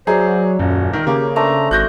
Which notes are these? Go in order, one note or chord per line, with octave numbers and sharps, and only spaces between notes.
F#3 G#4 C5 D5 E5 A#5
D#1 F#2 C#4
D#3 A#4
C#3 A#3 G4
A3 D4 C5 A#5
G#1 F#4 F#6 G6 A#6